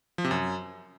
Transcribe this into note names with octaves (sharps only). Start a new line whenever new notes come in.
F3
C3
F#2